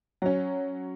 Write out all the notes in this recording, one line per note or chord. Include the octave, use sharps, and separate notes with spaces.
F#3 C#4